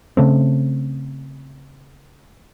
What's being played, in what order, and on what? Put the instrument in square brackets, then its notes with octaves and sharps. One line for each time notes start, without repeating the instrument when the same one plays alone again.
[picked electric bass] C#3 A3 C4